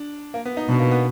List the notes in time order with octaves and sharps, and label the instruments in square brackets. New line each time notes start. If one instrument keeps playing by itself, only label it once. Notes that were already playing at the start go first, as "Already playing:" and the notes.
Already playing: [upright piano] D4
A#3
B3
D#4
[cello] B2 [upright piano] D4
[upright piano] A#3
B3